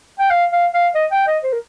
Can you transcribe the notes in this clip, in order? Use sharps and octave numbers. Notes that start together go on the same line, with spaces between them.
G5
F5
F5
F5
D#5
G5
D#5
C5
A#4